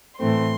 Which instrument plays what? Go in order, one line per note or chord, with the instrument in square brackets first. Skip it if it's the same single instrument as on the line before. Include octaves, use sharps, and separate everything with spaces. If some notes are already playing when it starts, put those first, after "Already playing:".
[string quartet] A2 E3 A3 C4 C6